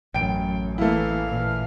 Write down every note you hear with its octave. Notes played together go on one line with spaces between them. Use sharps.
A1 F#2 G5 D7
E3 A3 A#3 E4 F5
A#2 E3